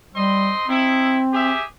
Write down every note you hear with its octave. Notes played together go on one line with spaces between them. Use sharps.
G3 C4 D#5 C6
C4 D#4 E4
G4 G#4 E5